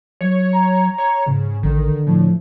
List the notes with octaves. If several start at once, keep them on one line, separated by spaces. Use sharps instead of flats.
F#3 C#5
A#5
C#5
G#2 C#3
A1 D3 D#3
A2 F3